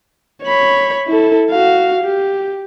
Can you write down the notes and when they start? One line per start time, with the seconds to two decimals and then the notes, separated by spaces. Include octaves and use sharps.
0.44 C#5 B5
1.07 E4 A4
1.51 F#4 F5
2.04 G4